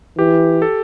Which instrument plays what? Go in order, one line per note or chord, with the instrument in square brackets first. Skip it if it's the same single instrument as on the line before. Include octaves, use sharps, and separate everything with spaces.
[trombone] E3 [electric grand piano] G4
[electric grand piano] A4